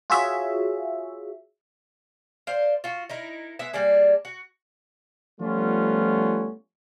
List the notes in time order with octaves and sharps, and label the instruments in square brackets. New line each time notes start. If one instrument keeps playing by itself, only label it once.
[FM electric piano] F4 F#4 G#4 C#5 E5
[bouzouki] C5 D5 F5
F4 F#4
D#4 E4 A#4
G#3 B3 E5
G3 A#3 D4 G#4
F#4
[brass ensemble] F3 G3 A3 B3 C#4 F4